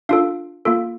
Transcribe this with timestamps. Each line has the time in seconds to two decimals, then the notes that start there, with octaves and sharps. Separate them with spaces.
0.09 D4 F4 A4 F5
0.65 A#3 F4 A4